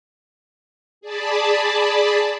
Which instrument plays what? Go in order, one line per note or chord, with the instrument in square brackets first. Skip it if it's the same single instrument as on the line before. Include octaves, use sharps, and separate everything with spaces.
[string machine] G#4 D5 A5 B5